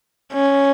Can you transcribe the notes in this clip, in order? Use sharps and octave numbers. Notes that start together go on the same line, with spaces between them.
C#4